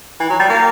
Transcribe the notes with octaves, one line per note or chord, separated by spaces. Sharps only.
E3
F#3
G3
A#3